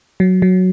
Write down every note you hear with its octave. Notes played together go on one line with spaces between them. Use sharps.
F#3
F#3